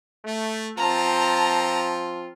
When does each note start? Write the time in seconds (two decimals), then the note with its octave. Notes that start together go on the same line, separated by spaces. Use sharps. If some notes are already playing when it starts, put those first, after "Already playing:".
0.25 A3
0.77 F3 C4 F4 A5 A#5